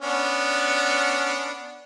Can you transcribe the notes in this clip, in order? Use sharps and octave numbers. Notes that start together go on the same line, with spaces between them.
B3 C#4 D4